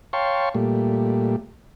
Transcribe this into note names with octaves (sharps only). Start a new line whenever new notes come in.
C#5 F5 G5 A5 C6 C#6
A#2 G3 A3